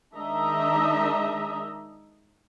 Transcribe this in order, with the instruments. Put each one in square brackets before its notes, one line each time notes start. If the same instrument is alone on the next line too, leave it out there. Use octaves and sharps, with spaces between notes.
[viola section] D#3 G#3 D4 D#5 E5 A#5